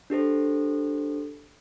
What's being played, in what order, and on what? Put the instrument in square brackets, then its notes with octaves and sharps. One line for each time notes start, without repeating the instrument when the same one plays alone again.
[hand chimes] D4 G4 A4 C5